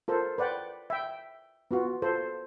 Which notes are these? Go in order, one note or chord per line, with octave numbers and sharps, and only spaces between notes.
F4 A4 A#4 C5
B4 D5 F#5 G5
E5 G5
B3 F4 F#4
F4 A4 C5